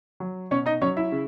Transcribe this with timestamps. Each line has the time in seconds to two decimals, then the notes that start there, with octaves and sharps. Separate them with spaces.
0.20 F#3
0.51 B2 C#4 C#5
0.66 D#4 D#5
0.81 F#3 C#4 C#5
0.97 E4 E5
1.12 C#3